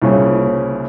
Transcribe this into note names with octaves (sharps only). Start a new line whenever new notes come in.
C2 A#2 C#3